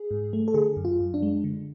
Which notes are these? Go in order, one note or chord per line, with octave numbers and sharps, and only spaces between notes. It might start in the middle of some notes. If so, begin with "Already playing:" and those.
Already playing: G#4
G#2
A3
A4
D3 G#4
F#2
F4
F#2
D4
G#3
D3